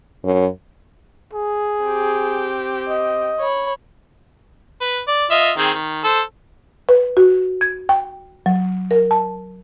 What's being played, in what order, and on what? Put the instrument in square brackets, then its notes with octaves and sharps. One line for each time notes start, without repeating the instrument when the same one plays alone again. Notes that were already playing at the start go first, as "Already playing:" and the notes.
[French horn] F#2
[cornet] G#4
[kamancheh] C4 G4
[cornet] D#5
[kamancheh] C#5 B5
[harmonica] B4
D5
F4 D#5 E5
D#3 C4 G#4
D#3
A4 C5
[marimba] B4
F#4
G#6
G5
F#3
A#4
A5